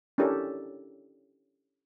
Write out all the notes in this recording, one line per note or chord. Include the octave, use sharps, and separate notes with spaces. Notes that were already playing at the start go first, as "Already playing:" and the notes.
C#4 D4 E4 G4 A4 A#4